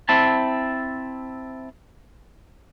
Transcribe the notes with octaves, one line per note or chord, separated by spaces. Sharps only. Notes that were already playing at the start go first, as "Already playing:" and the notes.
C4 E4 A5